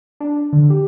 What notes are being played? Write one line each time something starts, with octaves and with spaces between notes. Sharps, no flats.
D4
D3
G4